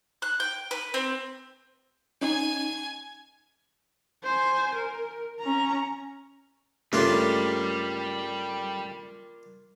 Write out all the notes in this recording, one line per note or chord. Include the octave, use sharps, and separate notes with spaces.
F#6
G5
B4
C4
C#4 D#4 G#5
C5 G#5
A#4
C#4 A#5
G2 C#3 G3 A3 A#3 D4 F4